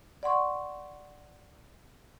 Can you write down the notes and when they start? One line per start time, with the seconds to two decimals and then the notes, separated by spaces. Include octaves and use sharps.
0.23 D5 F#5 C6 C#6